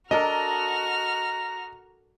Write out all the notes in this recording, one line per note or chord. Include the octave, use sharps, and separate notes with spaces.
D4 F#4 A4 A#4 D#5 A#5 F6